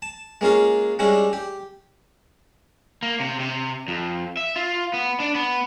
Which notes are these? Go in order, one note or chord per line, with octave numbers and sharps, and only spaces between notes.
A5
G#3 A#3 C#4 F4 G#4
G3 G#3 C#4 D4 E4
G4
A#3
C3
C3
F2
E5
F4
B3
D4
B3